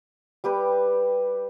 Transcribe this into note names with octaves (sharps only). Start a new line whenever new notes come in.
G3 G4 B4